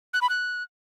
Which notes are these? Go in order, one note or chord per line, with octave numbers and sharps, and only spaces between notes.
F#6
B5
F#6